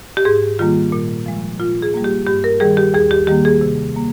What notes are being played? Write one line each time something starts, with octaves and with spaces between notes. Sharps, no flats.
G4
G#2 G#4
D#3 G3 A#3 F4
A#2
F3 G#3
A#2 F4
G#4
G3 A#3
G4
G2 G4
A#4
D#3 G3 G#4
G4
D#2 G#4
G4
D#3 G3 A#3 G4
G#4
C3
G3 A#3